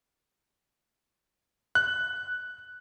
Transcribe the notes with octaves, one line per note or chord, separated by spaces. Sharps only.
F#6